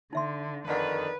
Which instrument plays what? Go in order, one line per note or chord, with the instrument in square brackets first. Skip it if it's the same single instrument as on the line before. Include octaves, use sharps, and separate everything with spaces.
[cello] D3 [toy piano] D#4 E5 C6
[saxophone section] F2 D3 D#3 [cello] B4 [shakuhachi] D5 [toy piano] F5 F#5